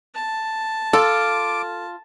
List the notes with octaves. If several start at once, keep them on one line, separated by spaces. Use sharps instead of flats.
A5
F4 A4 D6